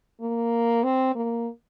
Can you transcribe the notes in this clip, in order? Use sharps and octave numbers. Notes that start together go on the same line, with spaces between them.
A#3
C4
A#3